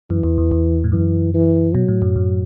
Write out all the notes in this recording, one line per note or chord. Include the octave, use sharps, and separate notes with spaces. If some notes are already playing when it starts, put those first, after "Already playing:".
F#2 E3
E2
E2
E2
A2
F#2 E3
E3
B2 F#3
A2
F#2
F#2